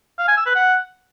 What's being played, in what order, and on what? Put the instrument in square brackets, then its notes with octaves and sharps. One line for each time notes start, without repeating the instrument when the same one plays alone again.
[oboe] F5
G#5
E6
B4
F#5